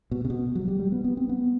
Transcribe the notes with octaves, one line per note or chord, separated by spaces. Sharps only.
B2
C3
B2
F#3
G3
G3
B3
B3
C4
B3